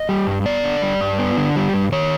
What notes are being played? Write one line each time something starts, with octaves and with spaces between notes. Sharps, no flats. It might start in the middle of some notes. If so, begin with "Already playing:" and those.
Already playing: D#5
G3
G2
B3 D5
D3
G3
G2
B3
D3
G3
G2
D#3 C#5